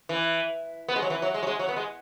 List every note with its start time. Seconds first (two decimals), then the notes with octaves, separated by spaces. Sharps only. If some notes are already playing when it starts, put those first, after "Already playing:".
0.09 E3
0.88 B3
0.96 G#3
1.02 F#3
1.10 E3
1.22 F#3
1.34 G#3
1.43 F#3
1.47 G#3
1.59 F#3
1.69 B3
1.76 G#3